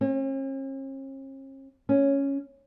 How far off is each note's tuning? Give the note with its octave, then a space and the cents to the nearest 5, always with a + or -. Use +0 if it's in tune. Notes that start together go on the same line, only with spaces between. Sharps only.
C#4 -45
C#4 +0